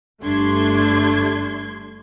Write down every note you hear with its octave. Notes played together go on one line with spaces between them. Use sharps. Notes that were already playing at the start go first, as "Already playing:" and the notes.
G1 G3 A3 D4 C6 G#6